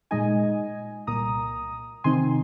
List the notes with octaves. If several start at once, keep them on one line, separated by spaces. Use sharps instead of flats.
A#2 G#3 D#4 D#5 G#5
C2 A#2 A#3 A#5 D#6
C3 D#3 C4 D#4 G#5 C6